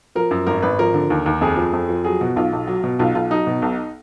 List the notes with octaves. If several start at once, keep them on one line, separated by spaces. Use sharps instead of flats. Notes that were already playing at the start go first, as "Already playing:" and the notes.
F3 A#4
F#2
G#1 A#4
G#1 B4
F3 A#4
D3
D#2
D#2
F2 G#4
F3
F2
F3
F#3 G#4
B2 F#4
B1 F4
B1
F#3
B2
B1 F4
B1 F4
F#3 D#4
B2
B1